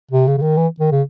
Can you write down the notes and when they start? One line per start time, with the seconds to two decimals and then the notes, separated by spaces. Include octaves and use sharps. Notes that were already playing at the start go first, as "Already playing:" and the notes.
0.11 C3
0.27 C#3
0.37 C#3
0.42 D#3
0.57 E3
0.80 D#3
0.92 C#3